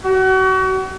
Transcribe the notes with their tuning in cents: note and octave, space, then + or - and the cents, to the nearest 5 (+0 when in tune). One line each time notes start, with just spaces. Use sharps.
F#4 +35